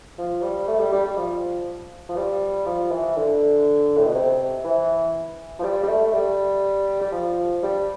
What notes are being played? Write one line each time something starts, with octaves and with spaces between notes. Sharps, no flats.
F3
G3
A3
G3
G3
G3
F3
F3
G3
F3
E3
D3
A2
B2
C3
E3
F3
G3
G3
A3
A3
G3
G3
F3
G3